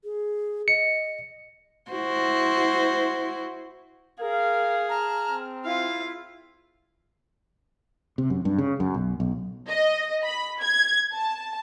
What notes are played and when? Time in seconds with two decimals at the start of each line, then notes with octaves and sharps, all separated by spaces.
0.04 G#4
0.68 D#5 C#7
1.91 E4 F#4 C5
4.20 G#4 A#4 F5
4.90 A5 A#5 F6
5.29 C4
5.65 E4 F4 F5
8.18 C3
8.30 F#2
8.45 G2
8.58 C#3
8.80 F#2
8.94 B1
9.20 B1
9.69 D#5
10.24 B5
10.61 G#6
11.14 A5